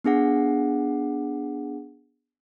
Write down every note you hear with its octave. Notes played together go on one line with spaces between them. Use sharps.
B3 D4 G#4 F#5